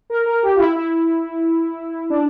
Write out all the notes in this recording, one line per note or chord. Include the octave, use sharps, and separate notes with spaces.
A#4
A#4
G4
F4
E4
E4
D4